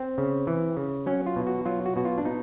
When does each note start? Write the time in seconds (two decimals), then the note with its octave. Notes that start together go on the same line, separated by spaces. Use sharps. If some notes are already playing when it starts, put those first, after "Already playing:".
Already playing: C4
0.18 C#3
0.47 E3
0.77 C#3
1.06 F#3 C#4
1.26 F4
1.36 B2
1.47 F#4
1.65 F#3 F4
1.86 F#4
1.96 B2 F#4
2.05 F4
2.18 D4
2.25 B2 D#4